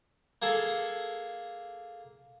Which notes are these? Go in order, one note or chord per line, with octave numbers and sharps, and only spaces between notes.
A#3 G#4 A4